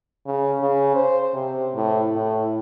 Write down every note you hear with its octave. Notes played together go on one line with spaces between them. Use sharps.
C#3
C#3
C5
C3
A2
A2